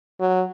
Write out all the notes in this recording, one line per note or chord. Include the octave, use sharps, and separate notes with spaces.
F#3